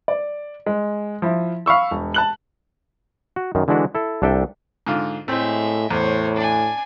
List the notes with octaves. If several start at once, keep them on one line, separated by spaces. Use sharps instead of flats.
D5
G#3
F3 E4
F5 B5 C#6 E6
E1
A5 F#6 F#7
F#4
F#2 D#3
D3 E3 G#3 D4 E4 F#4
E4 A4
C2 D4 A4 E5 G5
G#2 D3 F4
A2 G#3 A3 C4 E5
E2 A2 C5 C#5
D4 G#5